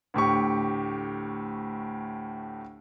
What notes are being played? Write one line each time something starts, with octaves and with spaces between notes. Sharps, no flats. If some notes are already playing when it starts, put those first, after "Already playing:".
D2 A2 G4 C#6